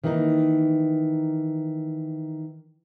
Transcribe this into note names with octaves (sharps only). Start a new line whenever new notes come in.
D#3 E3 A#3 C#4 D#4